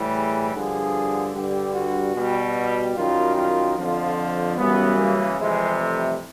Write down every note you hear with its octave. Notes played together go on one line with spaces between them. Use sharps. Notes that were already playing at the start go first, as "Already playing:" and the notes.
Already playing: A2 E3 G3
G#4
G2 D3 F3 G#4
G2 D3 G3 G4
F#4
B2 G3
F#2 D#3 G3 F4
F4
F2 D3 F3 F4
F#2 C#3 E3 G3 B3
A#3
F2 C3 E3 G3 G#3
A3